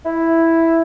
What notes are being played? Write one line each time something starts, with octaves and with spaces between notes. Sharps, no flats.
E4